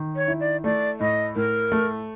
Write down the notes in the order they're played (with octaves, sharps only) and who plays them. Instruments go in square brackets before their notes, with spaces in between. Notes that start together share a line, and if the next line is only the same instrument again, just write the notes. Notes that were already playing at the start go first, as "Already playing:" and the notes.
Already playing: [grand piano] D#3
[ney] C#5
[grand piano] E4
[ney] D5
[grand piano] A3 [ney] D5
[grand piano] A2 [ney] D#5
[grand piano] A2 [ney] A#4
[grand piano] A3